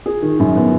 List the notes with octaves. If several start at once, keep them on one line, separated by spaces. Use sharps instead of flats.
G#4
D#3
F#2
B3